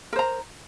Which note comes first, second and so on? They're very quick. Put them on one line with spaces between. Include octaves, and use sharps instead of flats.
A#4 C5 A#5